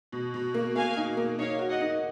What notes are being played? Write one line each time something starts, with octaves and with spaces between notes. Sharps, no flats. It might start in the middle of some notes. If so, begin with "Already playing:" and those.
B2
B2
A#3
A#3 F5 G#5
D#4
A#3
D#4 C#5 F5
F#4
D#5 F#5
D#4